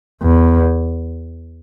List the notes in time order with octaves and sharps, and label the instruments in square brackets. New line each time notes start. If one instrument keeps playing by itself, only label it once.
[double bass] E2